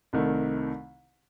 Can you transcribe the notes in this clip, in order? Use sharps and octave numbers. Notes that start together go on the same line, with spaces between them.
C2 C3 D#3 A3